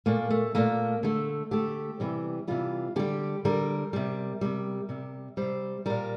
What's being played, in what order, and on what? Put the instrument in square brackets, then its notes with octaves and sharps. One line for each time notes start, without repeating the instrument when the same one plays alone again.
[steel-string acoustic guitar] A#2 A3 A#3
A3
A#2 A3 A#3
D3 A3
D3 A3 G4
C3 E3 G3
C3 E3 G3 F4
D3 G3 G4
D3 G3 A#4
C3 G3
C3 G3
C3 G3
C3 G3 C5
A#2 G3 A#4